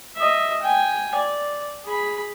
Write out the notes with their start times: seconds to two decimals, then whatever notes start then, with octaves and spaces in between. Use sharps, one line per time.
0.16 D#5 E5
0.62 G5 G#5
1.15 D5
1.85 G#4 B5